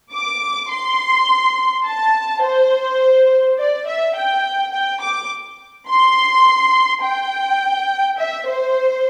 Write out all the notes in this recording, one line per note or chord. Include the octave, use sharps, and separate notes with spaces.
D6
C6
A5
C5
D5
E5
G5
G5
D6
C6
G5
E5
C5